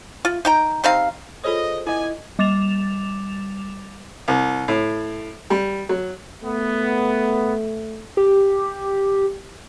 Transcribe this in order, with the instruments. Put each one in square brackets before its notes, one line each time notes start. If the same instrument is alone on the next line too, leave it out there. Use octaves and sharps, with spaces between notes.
[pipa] F4
D#4 G5 A#5
G3 C4 D#4 F5
[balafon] F4 A4 C#5 [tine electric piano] G#4 C5 [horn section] D#5
[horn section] B3 D5 G#5 [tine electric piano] E4 D#5
[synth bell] G3 D6 A6 E7 F7
[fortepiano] C2
A2
G3
F#3
[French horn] A3 [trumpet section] B3
[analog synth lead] G4